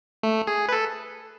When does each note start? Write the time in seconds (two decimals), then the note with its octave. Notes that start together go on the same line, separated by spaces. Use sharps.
0.23 A3
0.47 G#4
0.69 B4
0.73 A4